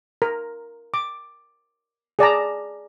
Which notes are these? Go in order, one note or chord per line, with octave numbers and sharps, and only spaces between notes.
A#4
D6
G#4 D5 A5 A#5